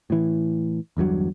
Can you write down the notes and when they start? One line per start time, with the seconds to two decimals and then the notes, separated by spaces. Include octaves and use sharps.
0.10 A2 E3
0.97 G1 E2 G2 F#3